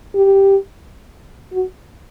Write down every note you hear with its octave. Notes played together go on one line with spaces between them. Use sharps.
G4
F#4